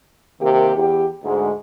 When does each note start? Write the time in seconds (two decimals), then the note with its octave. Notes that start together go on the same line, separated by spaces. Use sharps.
0.41 C3 D#3 A#3 G4
0.75 E2 G4
1.24 D2 G#2 G#3